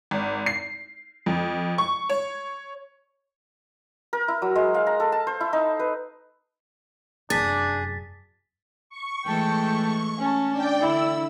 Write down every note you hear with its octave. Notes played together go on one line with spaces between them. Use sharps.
G#1
C7
F2
C#6
C#5
A#4
E4
F#3
G#3
F5
A#5
A4
A5
C5
E4
D#4
B4
F1 F#2 D4 G#4 A6 B6
C#6
E3 G#3 A3 G5 A5
C#4 A5
D4 D5 G5
D3 E4 E6